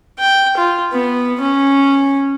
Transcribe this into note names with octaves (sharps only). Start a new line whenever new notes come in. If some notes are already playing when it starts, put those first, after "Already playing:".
G5
F4
B3
C#4